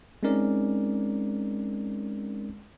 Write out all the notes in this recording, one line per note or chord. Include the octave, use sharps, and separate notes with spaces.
G#3 C4 C#4 D#4 A#4 D5